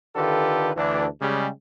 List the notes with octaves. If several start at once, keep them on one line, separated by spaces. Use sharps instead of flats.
D3 D#3 F4 G4 A4 B4
D2 E3 D4
C#3 G3 G#3